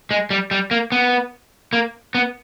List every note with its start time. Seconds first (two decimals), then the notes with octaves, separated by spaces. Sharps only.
0.11 G#3
0.31 G3
0.51 G3
0.71 A#3
0.92 B3
1.73 A#3
2.15 B3